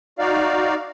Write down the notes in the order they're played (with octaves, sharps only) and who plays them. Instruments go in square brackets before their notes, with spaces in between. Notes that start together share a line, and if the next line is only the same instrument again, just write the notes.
[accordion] D#4 F#4 D5 F5